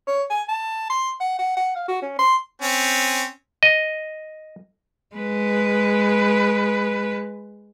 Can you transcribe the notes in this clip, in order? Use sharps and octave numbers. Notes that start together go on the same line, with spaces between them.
C#5
G#5
A5
C6
F#5
F#5
F#5
F5
F#4
C#4
C6
C4 C#4
D#5
G#3 B4